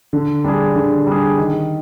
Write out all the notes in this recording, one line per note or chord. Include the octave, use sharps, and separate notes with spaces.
D3
G3 D4 G#4
D3
G3 D4 G#4
D#3